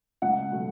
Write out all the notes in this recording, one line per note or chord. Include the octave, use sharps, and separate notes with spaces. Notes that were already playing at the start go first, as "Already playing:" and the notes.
C#2 F#5
B2 F#3 A3